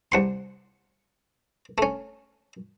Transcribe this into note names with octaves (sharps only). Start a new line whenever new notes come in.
C2 F#5 C6
A3 C#4